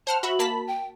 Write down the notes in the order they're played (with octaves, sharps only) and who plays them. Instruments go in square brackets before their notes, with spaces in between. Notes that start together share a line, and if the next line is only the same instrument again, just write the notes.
[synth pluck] C5 F#5 F6 [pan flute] A5
[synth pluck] F#4 E5 [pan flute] B5
[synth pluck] A#3 A5 B6
[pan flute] G5